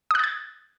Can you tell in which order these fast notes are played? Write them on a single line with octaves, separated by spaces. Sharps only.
D#6 F#6 A6 G#6